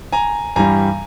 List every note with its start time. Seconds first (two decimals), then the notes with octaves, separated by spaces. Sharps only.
0.13 G#5 A#5
0.56 G2 E3 G3 G#5 A#5